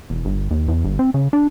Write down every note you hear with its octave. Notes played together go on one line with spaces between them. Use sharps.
E1
G1
D#2
E2
G1
C4
C#3
D4